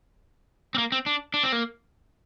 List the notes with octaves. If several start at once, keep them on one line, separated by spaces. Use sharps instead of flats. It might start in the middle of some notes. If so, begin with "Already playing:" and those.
C4
A#3
C4
D4
D4
C4
A#3